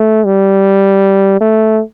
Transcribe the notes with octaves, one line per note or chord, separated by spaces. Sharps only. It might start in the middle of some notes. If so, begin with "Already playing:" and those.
Already playing: A3
G3
A3